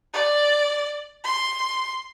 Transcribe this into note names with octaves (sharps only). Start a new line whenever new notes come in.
D5
C6